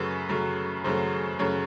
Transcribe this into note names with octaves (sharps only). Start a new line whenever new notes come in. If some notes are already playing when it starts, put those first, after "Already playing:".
Already playing: F#2 C#3 F#3 A3 B4
F#2 C#3 F#3 A3
F#2 C#3 F#3 A3 C5
F#2 C#3 F#3 A3 C#5